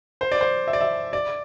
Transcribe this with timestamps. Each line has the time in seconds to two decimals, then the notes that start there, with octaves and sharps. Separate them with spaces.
0.21 C5
0.32 D5
0.41 C5
0.67 E5
0.73 D5
0.81 E5
1.13 D5